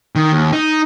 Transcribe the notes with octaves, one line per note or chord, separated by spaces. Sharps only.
D#3
D#2
D#4